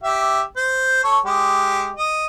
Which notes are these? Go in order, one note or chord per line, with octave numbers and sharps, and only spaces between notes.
G4 E5
C5
A4 C#5
G#3 G4
D#5